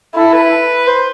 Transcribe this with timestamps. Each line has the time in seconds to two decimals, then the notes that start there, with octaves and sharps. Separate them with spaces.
0.15 E4 A4
0.33 B4
0.87 C5